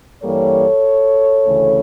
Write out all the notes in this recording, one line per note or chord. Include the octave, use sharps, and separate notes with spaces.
G2 E3 G3 A#3 A4 C#5
D2 C#3 E3 A3 C#4